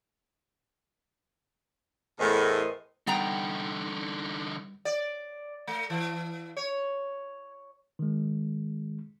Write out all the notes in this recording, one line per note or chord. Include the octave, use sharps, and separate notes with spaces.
E2 A2 A#4 C5 D#5
D3 G3 B3 D#4 G5 A#5
D5
A3
E3
C#5
D#3 G#3